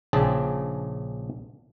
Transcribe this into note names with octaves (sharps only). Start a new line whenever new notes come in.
A#1 C#3 C4 D4 G#4 A5